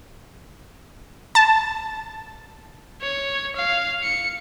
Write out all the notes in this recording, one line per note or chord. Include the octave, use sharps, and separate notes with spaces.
A5
C#5
F5
C#7